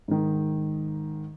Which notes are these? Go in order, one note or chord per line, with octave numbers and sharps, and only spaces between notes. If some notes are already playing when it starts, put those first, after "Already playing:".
G#2 D#3